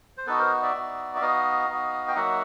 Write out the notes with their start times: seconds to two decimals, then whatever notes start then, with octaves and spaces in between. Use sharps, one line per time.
0.17 C5
0.26 B3 D#4 F#4 A4 B4
0.39 A#4 C5
0.63 D5 E5
0.74 B3 D#4 F#4
1.15 E5
1.21 B3 D#4 F#4 D#5 F5
1.68 B3 D#4 F#4
2.08 G5
2.16 F#3 A#3 D#4 F#4 E5 F#5